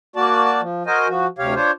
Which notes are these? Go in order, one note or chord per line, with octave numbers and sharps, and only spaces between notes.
A#3 F#4 D5 A5
F3
F#4 A#4 C5 D#5 G#5
F3 F#4
D2 C3 G4 C#5 F5
D4 F4 C5 C#5